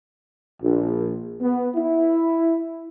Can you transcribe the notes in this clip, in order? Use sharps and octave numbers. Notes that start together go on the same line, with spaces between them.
A#1
B3
E4